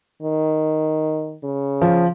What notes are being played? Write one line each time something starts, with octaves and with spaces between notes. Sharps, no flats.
D#3
C#3
F3